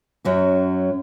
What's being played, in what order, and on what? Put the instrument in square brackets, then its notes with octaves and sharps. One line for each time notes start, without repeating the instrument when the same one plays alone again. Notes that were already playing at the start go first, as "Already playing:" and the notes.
[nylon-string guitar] F#2 F#3 C#4